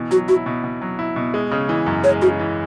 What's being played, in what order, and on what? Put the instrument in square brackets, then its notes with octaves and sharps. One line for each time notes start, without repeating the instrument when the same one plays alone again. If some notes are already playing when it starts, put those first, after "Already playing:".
Already playing: [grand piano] B2 E3
[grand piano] F#3 [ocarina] F#4
[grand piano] E4 [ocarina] F#4
[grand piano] B2
B2
F#3
E4
B2
G#3
C#3
E3
F#2
[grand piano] G#3 [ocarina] C#5
[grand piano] C#3 [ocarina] F#4
[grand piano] E3